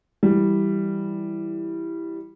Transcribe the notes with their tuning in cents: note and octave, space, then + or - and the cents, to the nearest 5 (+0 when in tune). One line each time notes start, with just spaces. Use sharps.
E3 +0 G3 +0